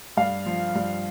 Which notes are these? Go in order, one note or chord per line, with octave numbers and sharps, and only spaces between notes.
G2 F5
F3
G2